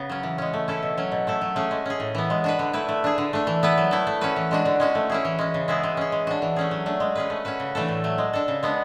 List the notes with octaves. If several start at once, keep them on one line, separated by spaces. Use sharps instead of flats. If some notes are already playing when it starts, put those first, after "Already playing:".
Already playing: C#3 B3
F#3 C#4
E3
G#3 C#4
A3
C#4 E4 A4
B2
F#3 C#4
B2
A3 E4 A4
F#3
A3 C#4 G#4
G#3
C#4 G#4
A2
E3 B3
G#3
D4 F#4 B4
D3
A3 E4 B4
A3
D4 G#4
D3
A3 D4
E3
B3 E4 B4
F#3
A3 E4 A4
A3
C#4 F#4 B4
E3
G#3 D4 F#4
D3
G#3 C#4 F#4
A3
C#4 E4 G#4
E3
G#3 C#4
C#3
G#3 B3 E4 G#4
G#3
C#4 G#4
G#3
D4 F#4
E3
A3 C#4 G#4
F#3
A3 D4
G#3
C#4 G#4 B4
A3
C#4 F#4 B4
C#3
E3 A3 D4 A4
A2
F#3 A3
G#3
D4 A4
C#3
G#3 B3 D4